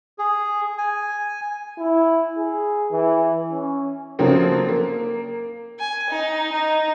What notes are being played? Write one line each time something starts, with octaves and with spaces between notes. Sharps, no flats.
G#4
G#5
E4
G#4
E3
C#4
C#3 F3 F#3 A3 A#3 C4
A#3
G#5
D#4
D#4